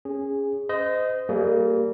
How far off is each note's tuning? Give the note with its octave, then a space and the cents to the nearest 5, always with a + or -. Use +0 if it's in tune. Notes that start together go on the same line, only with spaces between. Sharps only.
C#4 +0 G#4 -15
C5 -30 D#5 +0
G3 -25 A#3 -25 G#4 +25